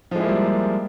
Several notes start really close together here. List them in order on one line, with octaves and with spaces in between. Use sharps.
F3 G#3 E4 A#3 G3